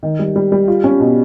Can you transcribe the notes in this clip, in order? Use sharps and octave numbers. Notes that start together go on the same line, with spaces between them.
D#3
G3
G3
G3
F4
C#4
B2